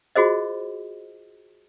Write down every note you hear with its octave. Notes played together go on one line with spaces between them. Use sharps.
F4 F#4 G#4 C5 D#5